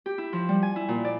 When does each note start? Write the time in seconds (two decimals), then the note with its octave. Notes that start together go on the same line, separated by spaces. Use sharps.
0.06 G4
0.18 E4
0.33 F3
0.49 G3
0.63 G#5
0.76 E4
0.88 A#2
1.05 D5